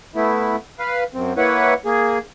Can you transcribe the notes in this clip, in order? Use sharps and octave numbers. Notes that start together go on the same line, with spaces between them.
A3 B3 E4
B4 F5
F#2 C4
A#3 E4 B4 C#5 F#5
A#3 G#4